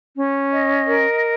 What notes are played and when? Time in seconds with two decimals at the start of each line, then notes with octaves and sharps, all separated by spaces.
0.15 C#4
0.51 D#5
0.87 A#4